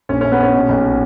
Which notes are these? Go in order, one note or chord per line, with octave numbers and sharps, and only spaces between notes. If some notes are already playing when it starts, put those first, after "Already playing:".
A#1 C#4
C#4
A#1
B3
A#1 C#4
B2
B1